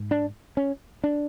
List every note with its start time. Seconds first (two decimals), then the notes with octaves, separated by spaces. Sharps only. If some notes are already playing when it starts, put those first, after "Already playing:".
Already playing: G#2
0.11 D4
0.57 C#4
1.04 D4